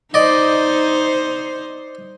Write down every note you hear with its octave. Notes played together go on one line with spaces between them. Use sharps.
D#4 C5 D5 D#5